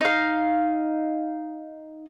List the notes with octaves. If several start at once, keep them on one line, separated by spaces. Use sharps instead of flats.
D#4 F5